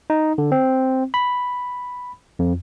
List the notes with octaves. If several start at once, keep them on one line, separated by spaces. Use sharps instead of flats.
D#4
D3
C4
B5
F2